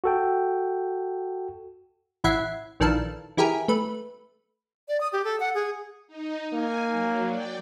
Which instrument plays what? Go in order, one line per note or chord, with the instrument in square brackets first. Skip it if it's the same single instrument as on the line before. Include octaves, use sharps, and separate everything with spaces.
[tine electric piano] F#4 A4 G5
[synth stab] A1 E4 E5 F#5 G#6 C7
A#1 D#3 E3 D4 A4 F5
E3 E4 G4 G#4 A#4
A3 B4
[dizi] D5
D#6
G4
A4
F#5
G#4
[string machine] D#4
[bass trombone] A#3 [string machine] G#5
[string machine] F#3
D5 G5